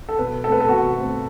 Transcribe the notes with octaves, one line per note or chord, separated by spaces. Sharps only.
A4
B2 B4
A3 C4 A4
B4
A4
B2 F#4
A3 C4